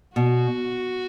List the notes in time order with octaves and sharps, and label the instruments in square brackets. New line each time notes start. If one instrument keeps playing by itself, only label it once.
[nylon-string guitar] B2 [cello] F#4